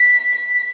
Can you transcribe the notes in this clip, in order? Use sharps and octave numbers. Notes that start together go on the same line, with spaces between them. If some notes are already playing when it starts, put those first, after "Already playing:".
Already playing: B6
B6